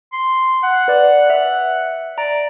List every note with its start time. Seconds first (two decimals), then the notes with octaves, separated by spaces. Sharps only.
0.13 C6
0.63 F#5
0.88 B4 D5
1.30 E5
2.18 D5 A#5